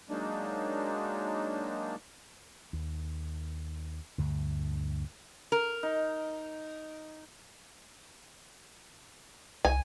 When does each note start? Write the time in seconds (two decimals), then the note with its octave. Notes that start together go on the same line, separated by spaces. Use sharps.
0.10 F#3 G#3 A#3 D4 D#4
2.73 D#2
4.18 D2 G2 D3
5.52 A#4
5.83 D#4
9.65 C2 G#5